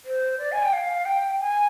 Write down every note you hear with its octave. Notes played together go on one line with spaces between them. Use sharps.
C5
D5
G#5
G5
F5
G5
G#5